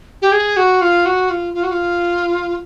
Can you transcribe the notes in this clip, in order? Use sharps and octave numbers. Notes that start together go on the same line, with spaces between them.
G4
G#4
F#4
F4
F#4
F4
F4
F#4
F4